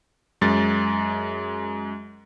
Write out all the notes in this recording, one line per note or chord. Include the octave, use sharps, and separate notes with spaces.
F#2 G#3 A6